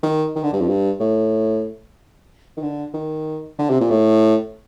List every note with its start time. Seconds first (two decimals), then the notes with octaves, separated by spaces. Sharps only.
0.03 D#3
0.36 D#3
0.44 D3
0.53 G2
0.61 F2
0.69 G2
1.00 A2
2.57 D#3
2.63 D3
2.94 D#3
3.59 D3
3.70 C3
3.81 A#2
3.91 A2